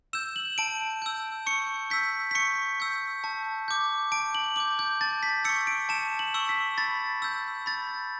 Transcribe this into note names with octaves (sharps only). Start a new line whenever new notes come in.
E6 G6 E7
F#7
A5 D7
E6 G6
C#6 C#7
E6 G6 B6
B6
C#6 C#7
E6 G6
A5
D6 G6
A5 D7
F#7
D6 G6 F#7
G6
A5 A6
B6
C#6 E6 C#7
D7
A5 E7
F#7
C#6 E6
B6
B5 A6
E6 G6
B5 A6